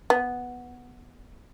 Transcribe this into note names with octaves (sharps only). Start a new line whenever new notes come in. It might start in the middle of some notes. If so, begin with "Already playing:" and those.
B3